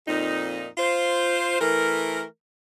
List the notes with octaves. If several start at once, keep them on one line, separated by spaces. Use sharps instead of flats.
F2 A#2 D#4
F4 C5
E3 A3 A#4